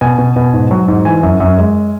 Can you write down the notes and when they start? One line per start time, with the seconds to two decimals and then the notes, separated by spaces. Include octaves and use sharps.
0.01 B2 G#5
0.18 B2
0.36 B2
0.53 G#2
0.71 F#3
0.88 G#2
1.05 E3 G#5
1.23 F#2
1.40 F#2
1.58 G#3